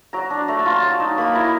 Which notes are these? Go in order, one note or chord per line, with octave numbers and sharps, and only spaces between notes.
F#3 A#5
D4
A3 A#5
A5
F4
A5
F#3
D#4
A#3 B5
E4 A#5